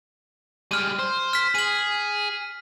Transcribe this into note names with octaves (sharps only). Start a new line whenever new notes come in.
G3 G#3 F6 D#7
C5
F6 B6
G#4 D#7 F#7